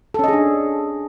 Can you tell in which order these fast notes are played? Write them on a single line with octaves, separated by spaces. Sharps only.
A4 C#4 D#5 G#4 D4